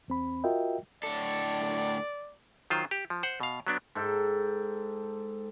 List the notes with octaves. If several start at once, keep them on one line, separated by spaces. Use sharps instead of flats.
E2 C4 B5
F4 F#4 A#4 D#5 E5 G5
A2 D3 A4 D5
D#3 F#3 F4 C5
G4
F3
C5 F#5
B2 F5
F#3 B3 D4
G#2 A4 G5